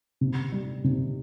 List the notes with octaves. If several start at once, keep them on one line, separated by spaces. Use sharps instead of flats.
C3
G3
C3